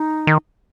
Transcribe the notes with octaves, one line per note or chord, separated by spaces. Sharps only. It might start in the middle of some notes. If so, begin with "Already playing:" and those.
Already playing: D#4
D#3